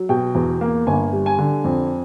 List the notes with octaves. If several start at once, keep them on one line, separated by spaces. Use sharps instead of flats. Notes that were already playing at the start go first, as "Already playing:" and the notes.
Already playing: F#3
B2 G5
E2
A#3
G1 G#5
G3
G#5
D3
F2